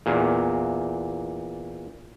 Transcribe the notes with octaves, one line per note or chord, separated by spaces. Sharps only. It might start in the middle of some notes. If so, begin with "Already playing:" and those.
E2 A#2